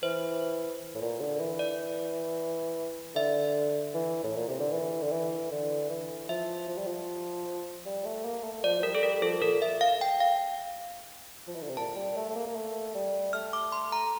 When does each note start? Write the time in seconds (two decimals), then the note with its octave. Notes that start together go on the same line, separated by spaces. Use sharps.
0.03 E3 C5
0.95 A2
1.01 A#2
1.20 D3
1.40 E3
1.59 D5
3.15 D3 E5
3.94 E3
4.24 A2
4.36 A#2
4.49 C3
4.60 D3
4.72 E3
5.03 D3
5.12 E3
5.51 D3
5.90 E3
6.29 F3 E5
6.68 F3
6.78 G3
6.87 F3
7.86 G3
8.05 A3
8.25 A#3
8.44 A3
8.64 F3 D5
8.79 F3
8.83 G3 A#4
8.95 A4
9.03 G3 A#4
9.22 F3 A4
9.42 A#2 A#4
9.62 E5
9.81 F5
10.01 G5
10.20 F5
11.48 F3
11.55 E3
11.62 D3
11.69 C3
11.77 A#2 A5
11.96 G3
12.16 A3
12.29 A3
12.35 A#3
12.47 A#3
12.55 A3
12.95 G3
13.33 A3 F6
13.53 D6
13.72 C6
13.92 A#5